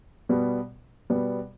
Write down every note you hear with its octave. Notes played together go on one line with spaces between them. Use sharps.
B2 G3 B3
B2 G3 B3